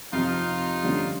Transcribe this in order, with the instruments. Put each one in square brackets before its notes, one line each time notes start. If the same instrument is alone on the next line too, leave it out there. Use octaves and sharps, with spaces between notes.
[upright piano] F2 C3 F3 [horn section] D#4 F4
[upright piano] G2 D3 F3 A3 C#4